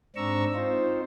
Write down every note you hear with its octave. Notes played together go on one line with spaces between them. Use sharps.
G#2 C4 D4 A#5 C#6 E6
C4 D#4 F4 C5